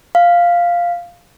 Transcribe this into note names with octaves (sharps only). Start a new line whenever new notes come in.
F5